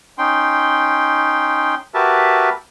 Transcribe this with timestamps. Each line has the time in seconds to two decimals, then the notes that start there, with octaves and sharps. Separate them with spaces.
0.18 C#4 D#4 G5 C6
1.94 F#4 G4 A#4 B4 E5 A5